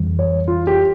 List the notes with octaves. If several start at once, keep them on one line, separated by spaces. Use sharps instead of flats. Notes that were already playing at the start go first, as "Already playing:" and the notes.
Already playing: F2 E3 G3
C#5
F4
G4